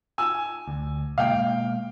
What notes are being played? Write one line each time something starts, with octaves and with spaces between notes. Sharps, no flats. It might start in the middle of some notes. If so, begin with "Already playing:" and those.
G#5 E6
D2
B2 G#3 A#3 F5 G5